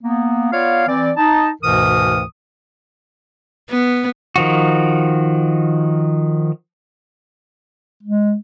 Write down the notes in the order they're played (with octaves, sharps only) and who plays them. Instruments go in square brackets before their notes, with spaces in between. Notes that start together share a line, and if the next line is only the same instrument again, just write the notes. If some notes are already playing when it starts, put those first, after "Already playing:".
[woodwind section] A#3 B3
B3 F4 C#5 D5 F5
E3 C4 D5
D#4 A5
D2 G#2 B2 E3 A#4 D#6
[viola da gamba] B3
[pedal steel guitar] D#3 F3 F#4
[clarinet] G#3